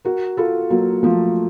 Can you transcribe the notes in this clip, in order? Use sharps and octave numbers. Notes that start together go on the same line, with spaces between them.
F#4 A#4
F4 A4
F#3 A#3
F3 A3